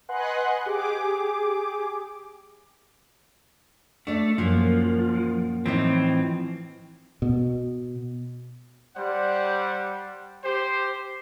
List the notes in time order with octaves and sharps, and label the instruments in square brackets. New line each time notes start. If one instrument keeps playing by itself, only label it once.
[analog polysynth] B4 D#5 F#5 G#5 C6 F#6
G4 G#4 D6
[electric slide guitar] A3 [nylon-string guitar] D4 D5
[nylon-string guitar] F#2 A#2 A#3 [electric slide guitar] F3
[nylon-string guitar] A2 D#4 [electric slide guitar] E3 F3 C4
[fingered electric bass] B2
[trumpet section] G3 C5 D5 F#5
G4 C5